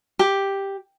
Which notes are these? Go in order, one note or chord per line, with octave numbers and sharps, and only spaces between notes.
G4